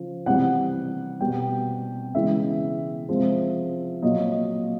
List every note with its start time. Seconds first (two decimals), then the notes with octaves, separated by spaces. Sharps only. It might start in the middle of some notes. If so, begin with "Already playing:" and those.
Already playing: C#3 F3
0.26 C3 E3 G3 F#5
1.20 B2 G3 G5
2.14 C#3 E3 G#3 E5
3.09 C3 F3 G#3
4.02 A#2 F#3 D#5